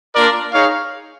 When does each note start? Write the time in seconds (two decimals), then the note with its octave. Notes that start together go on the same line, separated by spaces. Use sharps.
0.15 A#3 D4 F4 A#4 D5
0.53 D#4 G#4 C#5 F5